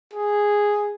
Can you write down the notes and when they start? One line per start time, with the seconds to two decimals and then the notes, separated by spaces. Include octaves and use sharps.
0.13 G#4